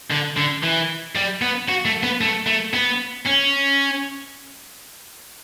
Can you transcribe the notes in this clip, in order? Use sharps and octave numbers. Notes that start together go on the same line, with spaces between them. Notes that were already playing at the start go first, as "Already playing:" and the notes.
D3
D3
E3
G3
B3
F#4
A3
B3
A3
A3
B3
C#4